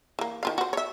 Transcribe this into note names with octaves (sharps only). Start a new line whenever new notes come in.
E3 A#3
D#3 F4 F5
F#4 C5
C#5 E5